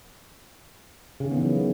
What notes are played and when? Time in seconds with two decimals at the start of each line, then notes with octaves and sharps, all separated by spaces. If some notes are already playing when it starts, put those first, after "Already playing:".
1.20 C#3
1.26 D#3
1.31 B3
1.37 E3
1.42 F#3